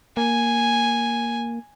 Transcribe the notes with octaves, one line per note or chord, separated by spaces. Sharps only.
A#3 G#5